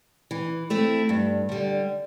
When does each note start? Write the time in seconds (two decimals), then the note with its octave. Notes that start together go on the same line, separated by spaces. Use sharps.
0.31 E3
0.70 A3 C4 E4
1.09 G2
1.49 D3 G3